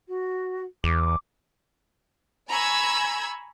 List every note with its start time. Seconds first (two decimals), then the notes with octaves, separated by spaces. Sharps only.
0.08 F#4
0.84 E2 D6
2.48 G#5 A#5 B5 C#6 E6 G#6